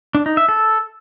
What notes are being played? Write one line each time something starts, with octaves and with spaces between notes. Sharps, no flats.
D4
D#4
E5
A4